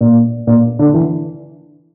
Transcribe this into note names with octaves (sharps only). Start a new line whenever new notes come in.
A#2
A#2
D3
E3